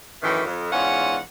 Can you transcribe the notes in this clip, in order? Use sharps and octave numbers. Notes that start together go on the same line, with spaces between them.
F#2 A2 D#3 E3
F2
E2 G#2 C#4 F4 F#5